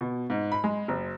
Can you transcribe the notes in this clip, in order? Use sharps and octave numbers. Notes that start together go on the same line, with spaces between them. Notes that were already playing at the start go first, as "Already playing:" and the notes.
B2
G#2
B5
G#3
F#1